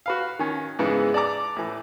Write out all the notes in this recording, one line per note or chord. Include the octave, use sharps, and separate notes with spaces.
F#4 B4 F5
D#3 C#4
G#2 C#3 E3 G#3 B3
D5 A5 A#5 D6
A2 E3